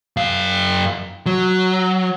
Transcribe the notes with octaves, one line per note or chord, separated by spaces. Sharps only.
F#2 F5
F#3